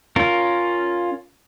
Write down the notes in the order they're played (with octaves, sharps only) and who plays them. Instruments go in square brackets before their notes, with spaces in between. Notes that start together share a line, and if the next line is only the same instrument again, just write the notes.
[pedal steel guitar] C#4 F4 A#4